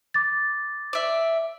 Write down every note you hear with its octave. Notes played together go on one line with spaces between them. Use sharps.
D6 A6
D5 E5